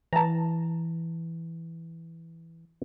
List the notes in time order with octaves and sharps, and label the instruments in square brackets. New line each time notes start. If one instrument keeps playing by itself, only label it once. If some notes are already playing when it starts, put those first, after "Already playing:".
[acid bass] E3 [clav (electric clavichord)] A5 A#5